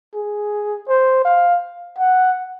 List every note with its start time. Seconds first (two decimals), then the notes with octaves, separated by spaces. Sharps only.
0.14 G#4
0.88 C5
1.25 F5
1.98 F#5